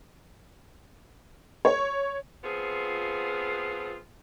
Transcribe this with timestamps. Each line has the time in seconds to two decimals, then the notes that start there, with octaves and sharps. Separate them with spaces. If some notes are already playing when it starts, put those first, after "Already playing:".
1.65 C#5
2.44 F3 B3 C4 F4 G#4